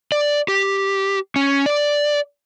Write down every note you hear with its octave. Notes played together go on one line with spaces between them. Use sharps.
D5
G4
C#4
D5